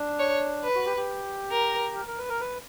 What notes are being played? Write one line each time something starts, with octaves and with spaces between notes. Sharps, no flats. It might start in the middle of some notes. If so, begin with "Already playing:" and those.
Already playing: D4
C#5
B4
F#4
G4
G4
A#4
A#4
A#4
B4
A#4
B4